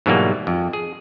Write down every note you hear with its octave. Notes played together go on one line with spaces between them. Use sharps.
G#2 B2 E3 F#3 G3 A#3
F2
G#4